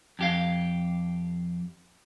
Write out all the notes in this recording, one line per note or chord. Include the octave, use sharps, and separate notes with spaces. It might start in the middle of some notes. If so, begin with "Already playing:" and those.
F2 G4 F5